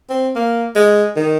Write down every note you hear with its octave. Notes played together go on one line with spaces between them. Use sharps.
C4
A#3
G#3
D#3